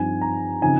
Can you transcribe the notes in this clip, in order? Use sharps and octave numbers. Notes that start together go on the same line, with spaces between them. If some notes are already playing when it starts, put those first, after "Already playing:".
Already playing: G2 F3 C4 D#4 G#5
A#5
C#3 F3 C4 D#4 G#5